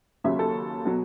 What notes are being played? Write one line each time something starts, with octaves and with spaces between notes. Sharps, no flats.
D#2 C#3 F#3 E5
A4
B2 F#3